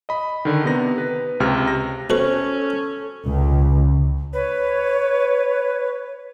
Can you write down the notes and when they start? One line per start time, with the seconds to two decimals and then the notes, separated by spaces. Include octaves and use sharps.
0.09 D#5 B5
0.45 D3 D#3
0.64 C3 B3 A#6
0.98 B4
1.40 C#2 C3 F6
1.67 A#6
2.10 B2 C#4 A4 B4 C5 C#6
3.26 C#2
4.33 B4 C#5